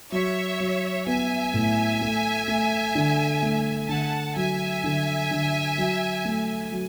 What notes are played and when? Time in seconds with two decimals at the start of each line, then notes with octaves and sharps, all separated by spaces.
0.12 F#3 C#5 E5
0.60 F#3
1.07 B3 E5 G#5
1.54 A2
2.01 A3
2.48 A3
2.95 D3
3.42 A3
3.89 D3 F#5 A5
4.36 F#3 E5 G#5
4.84 D3
5.31 D3
5.78 F#3
6.25 A3
6.72 F#3